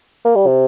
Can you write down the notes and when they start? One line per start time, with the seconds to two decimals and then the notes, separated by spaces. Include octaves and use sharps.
0.25 A#3
0.36 G3
0.47 C3